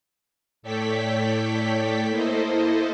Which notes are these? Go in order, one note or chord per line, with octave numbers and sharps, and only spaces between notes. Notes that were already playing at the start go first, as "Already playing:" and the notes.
A2 A4 C#5 D5 G5 B6
A#3 E4 A4 C5 D#5